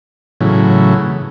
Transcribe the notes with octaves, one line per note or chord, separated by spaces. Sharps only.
A2 C#3 E3 F#3